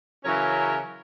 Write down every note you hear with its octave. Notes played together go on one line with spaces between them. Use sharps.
C#3 E3 F#3 C#4 A#4 C#5